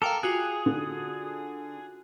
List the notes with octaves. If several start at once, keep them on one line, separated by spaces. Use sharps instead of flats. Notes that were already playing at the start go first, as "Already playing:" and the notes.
A4 A#4 F5 G5 D6
F4 F#4 G#4 F#6
D3